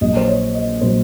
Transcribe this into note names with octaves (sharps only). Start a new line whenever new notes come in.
A#1 A#2 F#3 D#5
C5
C#5
D#5
A#2 F#3 C5